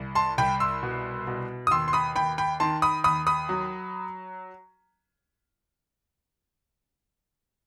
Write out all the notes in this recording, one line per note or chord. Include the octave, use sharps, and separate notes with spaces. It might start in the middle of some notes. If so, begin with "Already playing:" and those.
Already playing: C2
A5 C6
C2 G5 B5
C6 E6
B2
B2
D#6
D#2 C6 E6
C6
B5 D#6
D#2 G5 B5
G5 B5
D#3 A5 C6
B5 D#6
D#2 B5 D#6
B5 D#6
F#3